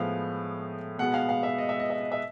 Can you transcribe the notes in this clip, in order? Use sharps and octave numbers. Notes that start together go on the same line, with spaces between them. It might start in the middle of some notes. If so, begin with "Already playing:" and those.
Already playing: A2 F3 G#3 B3 F5
B2 G#3 B3 F#5
F5
F5
E5
D#5
E5
D#5
E5
D#5
E5